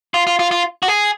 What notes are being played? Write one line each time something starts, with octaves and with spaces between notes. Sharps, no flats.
F4
F4
F4
F4
F#4
G#4